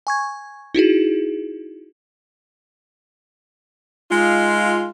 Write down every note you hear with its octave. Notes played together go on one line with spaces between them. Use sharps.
G#5 C#6 G#6
D#4 E4 F#4 G#4
G#3 D#4 F4